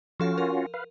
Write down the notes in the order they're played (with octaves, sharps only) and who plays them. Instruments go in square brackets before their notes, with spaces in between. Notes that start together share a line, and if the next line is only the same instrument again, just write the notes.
[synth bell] F3 A4 F5 [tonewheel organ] C#4 F4 F#4
[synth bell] A#4
[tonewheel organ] B4 F5